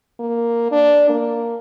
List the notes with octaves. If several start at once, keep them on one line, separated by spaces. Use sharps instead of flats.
A#3
D4
A#3